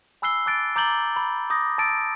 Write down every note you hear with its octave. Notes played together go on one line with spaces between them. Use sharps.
G#5 B5 E6 F#6 C7 G7
A5 D6 F#6 A6 D7
A#5 D6 G6 A6 F#7 G7
B5
D6 D#6 G6 A#6
A5 E6 A6 D7